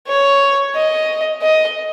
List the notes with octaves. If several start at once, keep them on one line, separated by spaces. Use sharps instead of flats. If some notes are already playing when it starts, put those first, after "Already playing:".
C#5
D#5
D#5